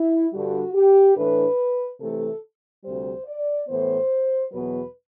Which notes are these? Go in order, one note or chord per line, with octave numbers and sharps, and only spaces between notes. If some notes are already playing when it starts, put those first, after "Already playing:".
Already playing: E4
G2 D3 G3 F#4
G4
A2 E3 A3 D4 B4
C3 E3 A3 A4
D2 C3 G3 C5
D5
A2 E3 B3 C5
E2 B2 F#3 B4